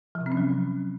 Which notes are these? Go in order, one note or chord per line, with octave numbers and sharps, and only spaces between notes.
F3
C3
C4
C#4
F#3